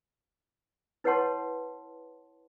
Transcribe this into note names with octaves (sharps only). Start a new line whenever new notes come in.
E4 B4 C#5 F#5 A5 C6